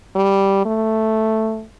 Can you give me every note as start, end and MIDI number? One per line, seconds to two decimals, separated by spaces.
0.15 0.61 55
0.65 1.65 57